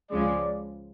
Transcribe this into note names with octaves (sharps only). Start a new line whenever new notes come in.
C#2 C#3 F3 G#3 D5